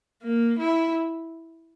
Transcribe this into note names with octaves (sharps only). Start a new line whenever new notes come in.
A#3
E4